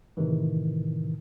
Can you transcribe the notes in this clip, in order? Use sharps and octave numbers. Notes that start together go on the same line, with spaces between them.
A2 C3 D#3 E3